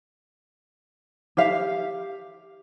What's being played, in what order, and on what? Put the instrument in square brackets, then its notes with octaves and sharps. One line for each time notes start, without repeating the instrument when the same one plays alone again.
[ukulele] G4 E5 F5